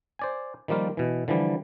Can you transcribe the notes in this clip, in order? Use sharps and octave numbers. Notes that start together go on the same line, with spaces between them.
C5 D5 G#5
D#3 F3 G3 A#3 F4
B2 E3
D3 E3 F3 G3